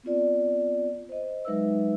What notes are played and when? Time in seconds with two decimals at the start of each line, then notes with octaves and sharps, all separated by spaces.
0.03 B3 C4 F4 D5
1.09 C5 D#5
1.45 F#3 G#3 D#4 B4 E5 E6